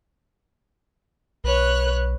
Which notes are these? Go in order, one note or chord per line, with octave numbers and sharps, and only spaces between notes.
B1 B4 C#5 F#6